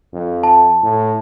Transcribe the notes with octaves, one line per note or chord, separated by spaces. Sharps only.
F2
A5
A2